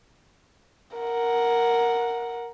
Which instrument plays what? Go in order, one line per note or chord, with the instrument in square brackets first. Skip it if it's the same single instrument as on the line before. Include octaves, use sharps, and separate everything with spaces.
[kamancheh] A#4 F#5